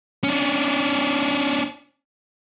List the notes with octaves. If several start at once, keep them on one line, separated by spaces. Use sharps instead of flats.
C#4 D4